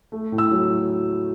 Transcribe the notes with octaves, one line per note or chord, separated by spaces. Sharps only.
A3
A2
E6
F#3